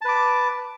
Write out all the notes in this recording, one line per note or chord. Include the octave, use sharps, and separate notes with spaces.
B4 A5 D6